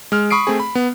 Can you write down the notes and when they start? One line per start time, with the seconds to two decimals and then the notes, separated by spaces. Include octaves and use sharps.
0.12 G#3 F6
0.31 B5 C#6 D#6 C7 D7
0.47 A3 C4 G#4
0.60 B5
0.75 B3